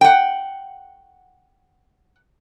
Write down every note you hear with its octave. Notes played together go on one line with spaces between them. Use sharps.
F#5 G5